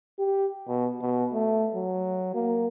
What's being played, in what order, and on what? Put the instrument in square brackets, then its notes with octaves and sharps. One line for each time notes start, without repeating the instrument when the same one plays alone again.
[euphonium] G4
B2
B2
A3
F#3
A#3